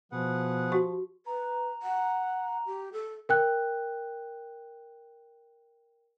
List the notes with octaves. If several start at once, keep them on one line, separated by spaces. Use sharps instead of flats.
B2 F3 G#4 B4 F#5
F#4 G4
B4 A#5
F#5
G4
A4
A#4 G5 F#6